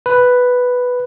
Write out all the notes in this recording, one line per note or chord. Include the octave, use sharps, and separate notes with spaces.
B4